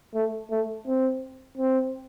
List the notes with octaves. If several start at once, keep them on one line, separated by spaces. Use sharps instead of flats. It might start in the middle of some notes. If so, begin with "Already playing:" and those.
A3
A3
C4
C4